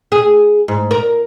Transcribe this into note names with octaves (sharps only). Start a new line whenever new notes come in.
G#4
G#2
A#4